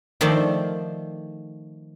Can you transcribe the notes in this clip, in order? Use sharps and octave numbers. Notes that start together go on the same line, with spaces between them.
D#3 F3 A3 C5 D5